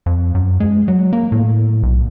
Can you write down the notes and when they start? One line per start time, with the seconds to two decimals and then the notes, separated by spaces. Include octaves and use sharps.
0.06 F2
0.35 F#2
0.60 G#3
0.88 F#3
1.13 A#3
1.32 A2
1.83 B1